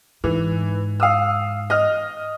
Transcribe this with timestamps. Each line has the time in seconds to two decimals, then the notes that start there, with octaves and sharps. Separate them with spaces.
0.24 G#2 E3
1.00 F5 D#6 E6
1.70 D#5 F6